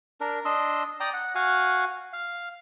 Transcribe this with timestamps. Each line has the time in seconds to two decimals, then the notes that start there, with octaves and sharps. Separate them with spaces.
0.21 D4 A#4
0.45 D4 D#5 C6 E6
1.00 D5 G5 A#5 D#6
1.14 F#5
1.35 F#4 F5 F#5 G#5
2.13 F5